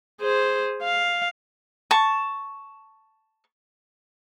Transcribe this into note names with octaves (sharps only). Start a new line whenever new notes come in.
G#4 C5
F5
A5 C#6